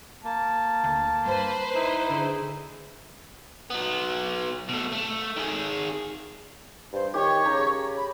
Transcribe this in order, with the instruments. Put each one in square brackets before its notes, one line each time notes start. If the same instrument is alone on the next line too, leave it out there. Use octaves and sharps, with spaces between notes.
[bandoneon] A#3 [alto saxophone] A5
[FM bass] D2
[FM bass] G2 [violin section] B4 C5
[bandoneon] D#4 E4
[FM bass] D3 [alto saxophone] G#4
[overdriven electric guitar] F#3 B3
B2 A3
A3
D#3 G#4
[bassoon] G2 [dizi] C5
[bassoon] D#3 [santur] G4 [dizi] C#5
[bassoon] C#3 [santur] A#5
[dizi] B5